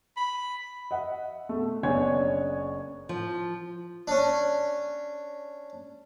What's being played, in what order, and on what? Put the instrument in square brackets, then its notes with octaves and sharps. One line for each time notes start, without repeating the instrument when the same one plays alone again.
[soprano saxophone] B5
[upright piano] D#5 E5 F#5
B2 A3
F#1 B3 D4 C#5 G#5 G#6
[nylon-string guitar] F3
[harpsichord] C#4 D4